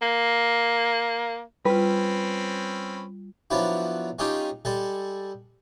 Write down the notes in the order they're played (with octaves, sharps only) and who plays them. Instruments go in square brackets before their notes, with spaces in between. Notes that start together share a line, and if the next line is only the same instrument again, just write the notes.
[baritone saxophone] A#3
[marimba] G3 F4 [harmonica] C4 C#4 B5 [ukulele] B4
[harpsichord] F3 F#3 B3 D4 E4 F#4
G#3 C#4 D#4 F4 G4 G#4
G3 G#3 A4